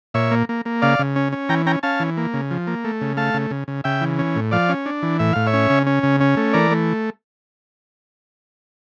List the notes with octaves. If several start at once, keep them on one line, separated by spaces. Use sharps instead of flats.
A#2 C#5 E5
A#3
A#3
A#3
C#3 D5 F5
C#3
C#4
C#4
E3 G5 A#5
C#4 G5 A#5
C#4 F5 A5
E3
A#3
C#3
F3
A#3
A3
C#3
A3 F5 A5
C#3
C#3
C#3
C#3 E5 G5
E3
C#4
A2
F3 D5 F5
C#4
D4
E3
A2 E5
A2 F5
C#5 E5
C#4
C#3
C#4
C#3
C#4
A3
E3 A#4 D5
A3